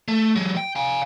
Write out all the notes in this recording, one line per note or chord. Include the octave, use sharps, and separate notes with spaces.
A3
F#3 G#3
G5
F5 G#5